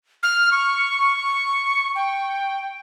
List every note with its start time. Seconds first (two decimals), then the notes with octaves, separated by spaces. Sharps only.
0.23 F6
0.51 C#6
1.95 G5